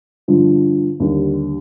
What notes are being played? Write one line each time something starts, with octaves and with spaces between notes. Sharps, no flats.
G2 D3 F3
D#2 D3 G3